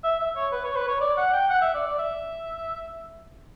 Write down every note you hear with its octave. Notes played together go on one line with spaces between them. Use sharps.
E5
E5
C#5
B4
C#5
B4
C#5
D5
F#5
G5
F#5
E5
D5
D5
E5